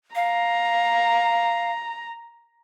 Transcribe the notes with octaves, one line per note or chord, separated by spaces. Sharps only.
F5 A#5